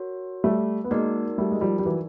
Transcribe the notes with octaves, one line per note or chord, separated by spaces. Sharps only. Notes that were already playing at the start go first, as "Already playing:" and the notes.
Already playing: F#4 A#4 C#5
G3 A3
B3
G#3 A#3 D#4 F#4 A#4 D5
G3 A3
G#3
F3 G3
G3
E3 F#3